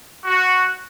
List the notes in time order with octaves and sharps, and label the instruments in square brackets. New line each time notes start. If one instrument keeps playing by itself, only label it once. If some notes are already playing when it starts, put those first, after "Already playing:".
[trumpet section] F#4